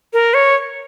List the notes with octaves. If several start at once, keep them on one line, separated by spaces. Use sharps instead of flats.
A#4
C#5